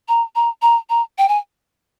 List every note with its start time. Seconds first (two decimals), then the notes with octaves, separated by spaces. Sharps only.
0.08 A#5
0.35 A#5
0.62 A#5
0.90 A#5
1.18 G5
1.29 G#5